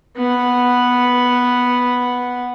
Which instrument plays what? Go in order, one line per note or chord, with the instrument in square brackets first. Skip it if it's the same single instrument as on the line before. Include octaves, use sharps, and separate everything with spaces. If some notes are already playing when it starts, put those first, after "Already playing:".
[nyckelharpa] B3 F#5